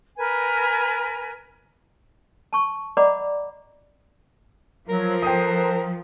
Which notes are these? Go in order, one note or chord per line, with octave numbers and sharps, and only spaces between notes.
A#4 B4 G#5
A5 C#6
D5 D#5 F#5 A#5 B5 D6
F3 F#3 A#4
A4 B4 C5 G5 D#6